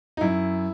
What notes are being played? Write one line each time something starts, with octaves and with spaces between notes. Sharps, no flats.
D#4
F#2 E4